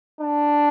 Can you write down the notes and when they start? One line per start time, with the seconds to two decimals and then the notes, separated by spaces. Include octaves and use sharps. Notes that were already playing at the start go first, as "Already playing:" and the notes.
0.21 D4